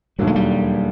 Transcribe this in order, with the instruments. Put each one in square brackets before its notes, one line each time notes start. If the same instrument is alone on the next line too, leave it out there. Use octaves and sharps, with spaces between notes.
[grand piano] E1 D#2 D3 F#3 A#3 [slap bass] G3
[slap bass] G#3
G3